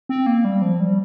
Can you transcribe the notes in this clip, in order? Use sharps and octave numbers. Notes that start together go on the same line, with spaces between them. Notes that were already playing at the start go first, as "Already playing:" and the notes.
C4
A#3
G3
F3
G3